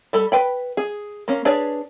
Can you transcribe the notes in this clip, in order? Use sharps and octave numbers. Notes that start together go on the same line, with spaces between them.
G3 A4 B5
B4 G5 B5
G#4
A#3 C#4
D4 G#4 B4 C#5 D5